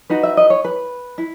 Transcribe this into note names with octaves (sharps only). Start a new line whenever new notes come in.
D#4 F#4 B4 F#5
E5
D#5
C#5
B4
E4